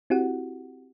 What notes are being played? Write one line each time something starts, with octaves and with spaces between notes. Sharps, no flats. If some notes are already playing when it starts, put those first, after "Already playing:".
C4 E4 F#4 G4 F#5